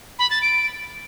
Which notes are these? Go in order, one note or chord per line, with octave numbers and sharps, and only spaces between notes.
B5
A6
D7